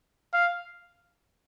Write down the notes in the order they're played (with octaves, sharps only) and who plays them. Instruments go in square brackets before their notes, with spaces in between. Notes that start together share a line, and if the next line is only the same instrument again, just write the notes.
[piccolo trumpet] F5